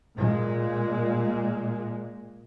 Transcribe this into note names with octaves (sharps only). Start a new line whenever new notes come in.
A#2 G#3